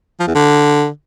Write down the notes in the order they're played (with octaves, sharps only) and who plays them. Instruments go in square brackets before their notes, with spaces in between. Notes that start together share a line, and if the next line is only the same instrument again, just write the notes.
[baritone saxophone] F3
E2
D3